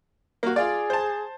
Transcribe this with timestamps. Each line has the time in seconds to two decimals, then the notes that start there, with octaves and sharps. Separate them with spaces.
0.43 A#3 F#4
0.56 F4 G#4 D5
0.90 C5 A5